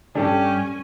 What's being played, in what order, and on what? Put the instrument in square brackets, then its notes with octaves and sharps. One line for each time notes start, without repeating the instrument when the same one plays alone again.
[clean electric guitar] D2 G2 [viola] C#4 G#5 [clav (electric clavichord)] D4 A4 [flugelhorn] G4